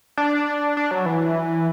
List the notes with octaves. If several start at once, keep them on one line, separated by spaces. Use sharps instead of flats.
D4
D4
F#3
E3